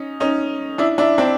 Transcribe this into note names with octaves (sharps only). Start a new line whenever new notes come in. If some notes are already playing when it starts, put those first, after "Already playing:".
Already playing: C#4 D#4
C#4 D#4
D4 E4
D4 E4
C4 D4